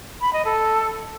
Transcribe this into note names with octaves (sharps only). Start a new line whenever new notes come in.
B5
D#5
A4